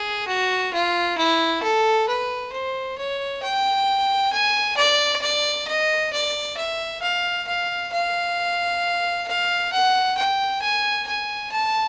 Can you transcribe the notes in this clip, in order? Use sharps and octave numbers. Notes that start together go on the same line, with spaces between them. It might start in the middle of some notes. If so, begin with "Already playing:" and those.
Already playing: G#4
F#4
F4
E4
A4
B4
C5
C#5
G5
G#5
D5
D5
D#5
D5
E5
F5
F5
F5
F5
F#5
G5
G#5
G#5
A5